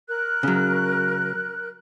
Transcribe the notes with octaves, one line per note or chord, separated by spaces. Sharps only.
A#4 F#6
C#3 F#3